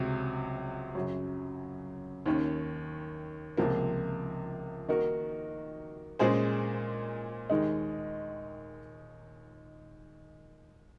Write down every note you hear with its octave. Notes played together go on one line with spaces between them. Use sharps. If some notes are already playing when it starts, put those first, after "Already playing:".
Already playing: C#2 C3 F#3 C#4
F#2 C#3 F#3
D#2 D#3 A#3 C#4
C#2 C3 F3 A#3
D#3 A#3 D#4 F#4 A#4
A#2 G#3 C#4 G#4 C5
D#2 D#3 G#3 D#4